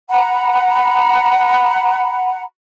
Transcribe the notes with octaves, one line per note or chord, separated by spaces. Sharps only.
F#5 A#5 B5